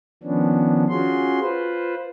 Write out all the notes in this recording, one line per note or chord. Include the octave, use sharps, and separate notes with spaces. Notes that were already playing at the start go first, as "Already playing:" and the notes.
D#3 F3 B3 C#4 D4
C#4 F4 F#4 G#4 C6
F4 B4 C5